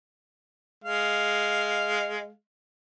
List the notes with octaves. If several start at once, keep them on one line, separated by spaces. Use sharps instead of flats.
G#3 F5